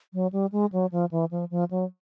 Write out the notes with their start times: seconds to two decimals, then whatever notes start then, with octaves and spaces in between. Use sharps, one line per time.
0.13 F#3
0.33 G3
0.52 G#3
0.72 F#3
0.92 F3
1.11 E3
1.31 F3
1.51 F3
1.71 F#3